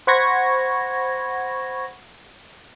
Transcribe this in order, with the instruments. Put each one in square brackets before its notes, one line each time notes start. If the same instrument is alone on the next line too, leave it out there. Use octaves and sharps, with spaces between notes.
[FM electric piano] C5 F#5 B5 C#6 G#6 A#6